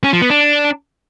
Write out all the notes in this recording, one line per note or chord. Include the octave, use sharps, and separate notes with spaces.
C#4
F3
B3
D4